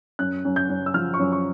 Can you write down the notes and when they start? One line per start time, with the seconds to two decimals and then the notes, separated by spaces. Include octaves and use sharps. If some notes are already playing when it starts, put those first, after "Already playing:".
0.19 F#2 F#6
0.45 F#2
0.56 G6
0.69 F#2
0.86 E6
0.94 F3 F6
1.14 C#6
1.19 F#2
1.32 C#6